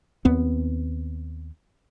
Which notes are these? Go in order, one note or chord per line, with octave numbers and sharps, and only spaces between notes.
D#2 B3 C4